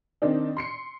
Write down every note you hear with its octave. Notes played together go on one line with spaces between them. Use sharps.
D#3 C4 D4 D#4
C6 C7 C#7